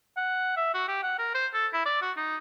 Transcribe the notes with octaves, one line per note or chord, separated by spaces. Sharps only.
F#5
E5
F#4
G4
F#5
A#4
C5
A4
E4
D5
F#4
D#4